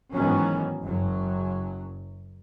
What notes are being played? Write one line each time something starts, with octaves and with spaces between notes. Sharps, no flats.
G#2 D#3 E3 F#3 B3 C#4
F#1 F#2 F#3